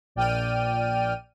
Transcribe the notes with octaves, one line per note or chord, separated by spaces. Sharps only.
A#1 D5 G5 F6 D#7